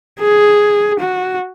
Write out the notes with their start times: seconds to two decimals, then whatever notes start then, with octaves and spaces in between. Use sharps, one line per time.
0.20 G#4
1.00 F#4